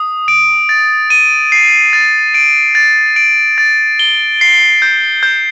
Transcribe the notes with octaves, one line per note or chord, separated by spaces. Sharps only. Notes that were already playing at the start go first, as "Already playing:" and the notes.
Already playing: D#6
D7
A6
D#7
C7
A6
D7
A6
D7
A6
G7
C7
G6
G6